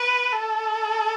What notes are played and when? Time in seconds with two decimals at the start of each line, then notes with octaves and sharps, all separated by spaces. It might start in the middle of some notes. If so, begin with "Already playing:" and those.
Already playing: B4
0.32 A4